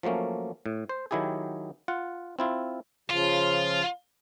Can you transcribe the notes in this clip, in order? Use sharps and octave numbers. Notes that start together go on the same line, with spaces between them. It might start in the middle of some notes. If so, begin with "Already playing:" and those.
F3 F#3 A3 A#3 C#4
A2
C5
D#3 F#3 E4 G4 G#4
F4 F#5
C4 E4 F4
C#3 F3 F4